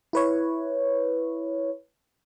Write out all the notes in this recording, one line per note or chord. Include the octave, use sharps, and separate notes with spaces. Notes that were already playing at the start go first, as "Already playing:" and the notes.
E4 B4 C#5